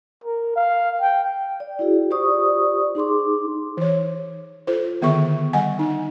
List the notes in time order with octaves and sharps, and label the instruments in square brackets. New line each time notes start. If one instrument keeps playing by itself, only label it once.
[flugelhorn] A#4
F5
G5
[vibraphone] D5
E4 F#4 G#4
F4 G4 C5 D5 C#6 D#6
D#4 G#4 C6 D6
[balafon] E3 C#5
F4 A4 C5
D3 D#3 B3 G#4 E5 C#6
G3 D#5 F#5 G#5
D#4